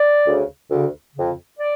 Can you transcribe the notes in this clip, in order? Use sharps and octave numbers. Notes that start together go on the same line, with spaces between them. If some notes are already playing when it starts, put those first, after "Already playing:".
Already playing: D5
D2 C#3
D2 C#3
F2 C#3
D5